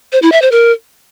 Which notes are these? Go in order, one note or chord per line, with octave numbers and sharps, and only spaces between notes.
C5
E4
E5
C5
A#4